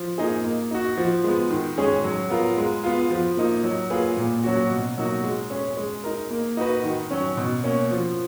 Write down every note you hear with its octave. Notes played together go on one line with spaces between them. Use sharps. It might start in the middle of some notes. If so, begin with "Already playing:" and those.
Already playing: F3
A#3 D#4 G#4
A#3
D#4 F#4
F3
G#3 B3
D#3
G#3 C#4 G#4
F#3
B3 F4 A#4
G#3
B3 F4
F3
A#3 D#4
F#3
A#3 F4 G#4 B4
A#2
F#3 C#4 F#4
B2
F#3 A#3 D#4 F#4
G#3
C#4 G#4
G#3
D#4 A#4
A#3
D#4 F#4 B4
D#3
F#3 C#4
B2
A#3 C#4
F3